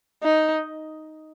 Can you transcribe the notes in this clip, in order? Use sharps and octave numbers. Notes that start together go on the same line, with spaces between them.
D#4